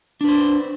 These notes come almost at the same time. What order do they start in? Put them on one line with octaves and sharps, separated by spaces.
D4 B4 C5